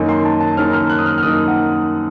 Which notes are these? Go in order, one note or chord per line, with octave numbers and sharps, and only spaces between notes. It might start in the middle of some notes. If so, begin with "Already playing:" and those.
Already playing: F#2 D#3 A#3 D#4
C6
A5
A5
F#2 D#3 A#3 D#4 F6
F6
F#6
D#6
F6
F6
F#2 D#3 A#3 D#4 D#6
F#5